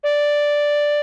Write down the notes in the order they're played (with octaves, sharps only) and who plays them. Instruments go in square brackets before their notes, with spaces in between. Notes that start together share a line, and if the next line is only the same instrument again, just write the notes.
[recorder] D5